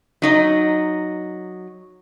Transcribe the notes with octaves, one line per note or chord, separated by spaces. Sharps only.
F#3 D#4 D#5